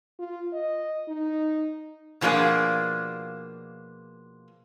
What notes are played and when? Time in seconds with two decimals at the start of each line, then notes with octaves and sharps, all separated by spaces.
0.19 F4
0.53 D#5
1.08 D#4
2.21 B2 F3 A#3 D4 G#4